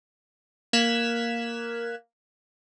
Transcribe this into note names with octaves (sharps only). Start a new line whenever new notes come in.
A#3 F6 F#6 G#6 B6 E7